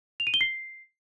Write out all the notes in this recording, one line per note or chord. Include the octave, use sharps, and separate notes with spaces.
F7
D#7
G7
C7